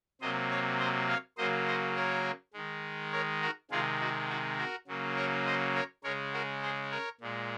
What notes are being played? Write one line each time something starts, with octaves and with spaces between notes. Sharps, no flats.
C3 F#3 A#3 C5 D#5
C#5 F5
C5 D#5
C#5 F5
C#3 F#3 A#3 C5 D#5
C5 D#5
A#4 C#5
D#3 G#3
A#4 C#5
F#4 A#4
C3 D#3 G#3 F4 G#4
D#4 F#4
D#4 F#4
F#4 A#4
C#3 F#3 A#3
A#4 C#5
C5 D#5
A#4 C#5
C#3 G#3 A#4 C#5
F#4 A#4
G#4 C5
A#4 C#5
A#2 G#3